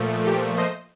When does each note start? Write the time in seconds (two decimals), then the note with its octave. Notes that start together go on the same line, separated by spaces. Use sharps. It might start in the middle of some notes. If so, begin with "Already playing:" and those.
Already playing: A#2 F3 A3
0.27 G4
0.57 C5 D#5